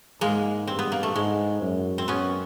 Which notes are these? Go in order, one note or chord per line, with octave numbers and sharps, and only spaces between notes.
G#2 G#3 A#3
G2 C4
B3
A#3
A3
G#2 G#3
F#2
C4
F#2 B3 C#4